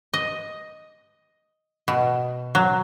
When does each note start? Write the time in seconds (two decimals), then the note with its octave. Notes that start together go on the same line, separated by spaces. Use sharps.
0.14 D#5
1.88 B2
2.55 F#3